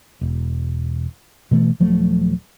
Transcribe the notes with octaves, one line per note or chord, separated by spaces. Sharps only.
E1
B2 E3 A3
D#1 F3 F#3 A3